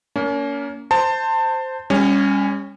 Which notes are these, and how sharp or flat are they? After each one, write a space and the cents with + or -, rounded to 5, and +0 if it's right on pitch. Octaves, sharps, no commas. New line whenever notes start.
A#3 +0 C#4 +35
C5 -5 A5 +25 C6 +0
G3 +40 C#4 +0